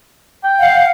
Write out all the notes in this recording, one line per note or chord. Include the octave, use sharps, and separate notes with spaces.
G5
F5 F#5